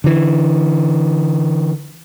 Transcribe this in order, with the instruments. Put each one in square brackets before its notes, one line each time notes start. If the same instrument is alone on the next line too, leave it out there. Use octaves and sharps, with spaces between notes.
[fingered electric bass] D3 E3